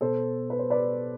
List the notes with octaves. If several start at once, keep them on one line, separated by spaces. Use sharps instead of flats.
B2 A4 C5
B4
C5
B4 D5